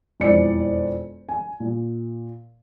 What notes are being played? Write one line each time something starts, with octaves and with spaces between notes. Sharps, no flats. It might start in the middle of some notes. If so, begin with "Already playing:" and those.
E1 F2 E3 D5 C#7
G#5
A#2